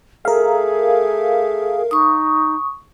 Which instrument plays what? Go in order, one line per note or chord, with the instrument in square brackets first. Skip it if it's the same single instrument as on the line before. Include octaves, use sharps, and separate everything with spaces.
[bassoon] A3 [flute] G#4 [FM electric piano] A#4 F5
[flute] D#4 [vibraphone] C#6 D#6